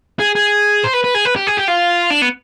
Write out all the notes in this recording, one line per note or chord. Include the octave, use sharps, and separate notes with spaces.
G#4
G#4
C5
B4
B4
G#4
B4
G4
G#4
G4
F4
D4
B3